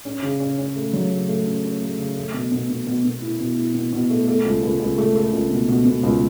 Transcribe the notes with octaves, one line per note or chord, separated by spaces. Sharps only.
C#4
C#3
C#4
C#4
A3
F#3
C#3
A3
C#4
C#4
A3
C#3
A3
B2
B2
B2
B2
B2
E4
B2
E4
B2
B2
A3
A3
C#2
C#2
C#2
A3
A3
C#2
B2
B2
B2
C#2